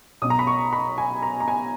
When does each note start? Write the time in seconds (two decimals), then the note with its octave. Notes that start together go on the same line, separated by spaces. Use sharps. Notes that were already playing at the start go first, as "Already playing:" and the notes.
0.22 B1 B2 D#6
0.30 A#5
0.39 B5
0.47 C#6
0.73 B5
0.98 G#5
1.23 A#5
1.40 A#5
1.48 G#5